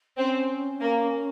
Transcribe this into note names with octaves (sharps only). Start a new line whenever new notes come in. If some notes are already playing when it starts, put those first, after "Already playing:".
C4 C#4
A#3